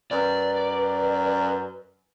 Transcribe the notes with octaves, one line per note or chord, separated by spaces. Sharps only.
F#2 B4 D5